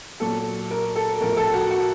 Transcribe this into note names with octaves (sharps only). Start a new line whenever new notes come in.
A#2 F#3 A4
A#4
A4
A2 F3 A#4
A4
F#4
F#4